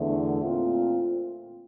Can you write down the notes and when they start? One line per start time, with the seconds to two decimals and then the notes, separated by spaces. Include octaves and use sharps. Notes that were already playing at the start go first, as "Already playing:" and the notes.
Already playing: E2 D3 A3
0.42 A#2 A3 C4 F4